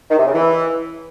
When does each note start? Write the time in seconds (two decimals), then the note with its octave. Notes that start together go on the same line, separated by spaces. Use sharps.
0.10 D#3
0.18 C3
0.26 C#3
0.34 E3